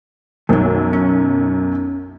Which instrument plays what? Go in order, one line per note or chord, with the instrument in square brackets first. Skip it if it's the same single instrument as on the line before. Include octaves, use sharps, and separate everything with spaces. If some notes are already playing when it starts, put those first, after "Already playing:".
[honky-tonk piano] B1 F#2 [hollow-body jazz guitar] D#3 F#3
[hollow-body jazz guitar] C#4